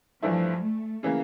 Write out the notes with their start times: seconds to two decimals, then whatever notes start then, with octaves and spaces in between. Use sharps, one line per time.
0.22 G2 E3 F3 A3 E4
0.63 A3
1.03 C#3 E3 A#3